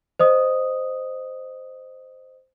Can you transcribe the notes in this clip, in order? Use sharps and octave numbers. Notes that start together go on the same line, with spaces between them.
C5 D#5 D#6